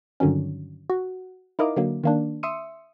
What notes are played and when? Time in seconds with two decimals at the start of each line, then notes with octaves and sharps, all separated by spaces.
0.20 G2 D3 D#3 F#3 C#4
0.90 F#4
1.59 D#4 E4 A#4 D#5 F5 D6
1.76 D3 F#3 A#3
2.04 D#3 A#3 D4
2.43 E5 C6 D#6 E6 C#7 D#7